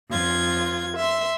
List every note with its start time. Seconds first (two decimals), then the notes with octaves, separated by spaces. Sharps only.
0.11 F2 F4 G#6
0.96 E5 C6